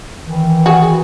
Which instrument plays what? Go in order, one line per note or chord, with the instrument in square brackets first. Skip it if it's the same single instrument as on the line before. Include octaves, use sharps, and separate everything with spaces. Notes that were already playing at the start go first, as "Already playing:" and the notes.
[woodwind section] D#3 E3
[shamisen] F#4 G#4